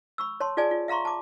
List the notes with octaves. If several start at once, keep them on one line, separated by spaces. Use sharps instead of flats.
B5 C#6 E6
C#5 A5 C6
F4 G#4 D5 G#5 A5
F4
E5 F5 A#5 C6 C#6
A5 D6